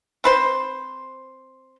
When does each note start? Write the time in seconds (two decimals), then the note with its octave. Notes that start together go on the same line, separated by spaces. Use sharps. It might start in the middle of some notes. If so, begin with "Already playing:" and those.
0.24 C4 B4 C5